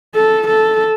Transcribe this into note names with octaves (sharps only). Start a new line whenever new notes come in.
A4
A4